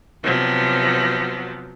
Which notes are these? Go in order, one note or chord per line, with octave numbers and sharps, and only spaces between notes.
C3 F3 F#3 B3